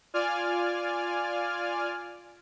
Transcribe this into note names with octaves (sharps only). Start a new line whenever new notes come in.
F4 D5 G#5 F6